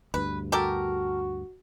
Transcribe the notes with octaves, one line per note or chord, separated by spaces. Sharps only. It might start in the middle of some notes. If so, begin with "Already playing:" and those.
D2 G2 B4
F#4 G4 A4 A#4